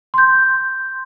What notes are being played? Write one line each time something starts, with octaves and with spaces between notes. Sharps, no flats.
C6 G6